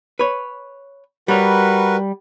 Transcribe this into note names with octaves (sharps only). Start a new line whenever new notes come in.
B4 C#5
G3 F#4 A#4 B4 C#5